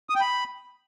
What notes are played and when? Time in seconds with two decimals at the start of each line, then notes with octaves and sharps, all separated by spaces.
0.10 D#6
0.15 G5
0.21 B5